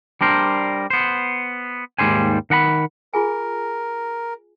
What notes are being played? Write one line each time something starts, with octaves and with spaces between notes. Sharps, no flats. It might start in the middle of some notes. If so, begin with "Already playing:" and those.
G3 D4 A#4 C5
B3 C5
D#2 G#2 G3 C5 G#5
D#3 F#5 A#5 B5
F4 G#4 A#4 G#5